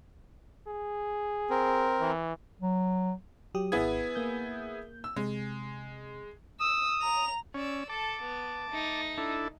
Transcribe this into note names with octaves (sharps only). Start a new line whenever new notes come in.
G#4
C4 A#4
E3
F#3
F#3 G4 D#6
G#1 B3 E4 G#4 G#6
A#3 G6
E6
C3 G#3
D#6 E6
A#5 F7
C#4 D5 E6
A4 A5 D6
B3
A3 D#4
D4 E4 A4